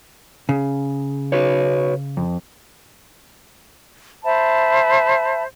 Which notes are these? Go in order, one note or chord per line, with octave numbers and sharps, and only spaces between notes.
C#3
F#4 B4 C#5
F2
C5 E5 A5 B5